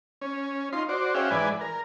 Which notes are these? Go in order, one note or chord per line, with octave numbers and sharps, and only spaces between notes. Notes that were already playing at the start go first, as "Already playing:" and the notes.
C#4
D#4 F4 C6
F#4 C5 D5
C#4 F#4 G#4 E5 F5 G5
G#2 E3 B4 D5 G#5
A#4